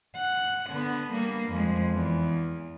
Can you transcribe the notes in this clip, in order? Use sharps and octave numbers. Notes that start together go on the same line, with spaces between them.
F#5
D3 B3
G3 A#3
F2 G#3
E2